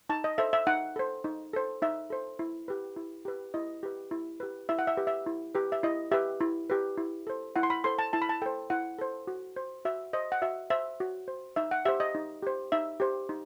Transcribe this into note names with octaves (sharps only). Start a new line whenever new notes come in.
D#4 A5
D#5
A4 C5 E5
E5
D#4 F#5
A4 C5
D#4
A4 C5
D#4 E5
A4 C5
E4
G4 B4
E4
G4 B4
E4 D#5
G4 B4
E4
G4 B4
E4 E5
F#5
E5
G4 B4
E5
E4
G4 B4
E5
E4 D#5
G4 B4 E5
E4
G4 B4
E4
A4 C5
E4 F#5
C6
B5
A4 C5 C6
A5
E4 A5
B5
A5
A4 C5 G5
E4 F#5
A4 C5
F#4
C5
F#4 E5
C5 D#5
F#5
F#4 E5
C5 E5
F#4
C5
D#4 E5
F#5
G4 C5 E5
D#5
D#4
G4 C5
D#4 E5
G4 C5
D#4